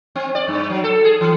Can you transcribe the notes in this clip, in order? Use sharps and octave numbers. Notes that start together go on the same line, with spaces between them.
C4
D5
G2
F#3
A4
G#4
E3